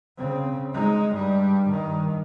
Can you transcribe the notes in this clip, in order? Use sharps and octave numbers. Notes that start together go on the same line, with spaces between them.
C#3 C4
G#3 D#4
G2 G3
G2 D#3